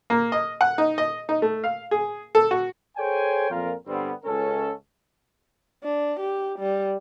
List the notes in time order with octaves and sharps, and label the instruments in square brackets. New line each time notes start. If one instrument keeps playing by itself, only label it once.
[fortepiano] A#3
D#5
F#5
D#4
D#5
D#4
A3
F5
G#4
A4
F#4
[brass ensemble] G#4 A4 C5 C#5 G5 G#5
F2 A#2 F4 A#4
G2 D3 G3 B3 C4
C#2 C#4 A4
[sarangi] D4
G4
G3